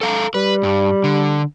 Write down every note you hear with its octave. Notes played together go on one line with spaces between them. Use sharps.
A4 F5 A#5
G3 B4
G2
D3